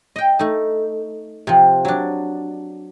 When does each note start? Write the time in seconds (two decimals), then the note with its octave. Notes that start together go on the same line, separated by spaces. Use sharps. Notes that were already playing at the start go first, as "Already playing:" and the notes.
0.16 D#5 G5
0.39 A3 D#4
1.47 C3 F3
1.85 F#3 D4